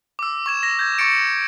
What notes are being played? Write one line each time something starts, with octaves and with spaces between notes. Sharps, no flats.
D6 E6
C#6 G#6 E7
A#6
G6 G#6
C#6 E6 A6 C#7 D7